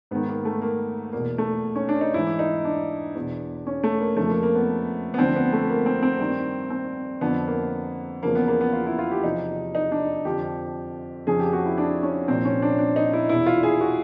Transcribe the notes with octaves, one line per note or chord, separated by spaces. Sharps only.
G#2 D#3 B3
A#3
A3
A#3
E2 B2 A#3
A3
C#4
D4
D#4
G#2 E3 E4
D#4
D4
E2 B2
C#4
A3
A#3
F2 C#3 F3 A3
A#3
A#3
B3
B3
D2 D3 F3 C4
B3
A3
A#3
C4
C4
G2 D#3
C4
F2 D3 F3 B3
A#3
E2 C#3 F3 A#3
B3
A#3
B3
F4
E4
F4
G4
E2 C3 F3 D#4
D#4
D4
F2 D3 F3 G4
F2 C#3 F3 G#4
G4
F#4
E4
D4
C#4
C2 A#2 F3 C4
C#4
D4
D4
D#4
E4
E2 B2 E4
F4
G#4
F#4